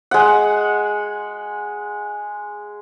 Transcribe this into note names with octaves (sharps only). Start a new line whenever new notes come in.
G#3 F#5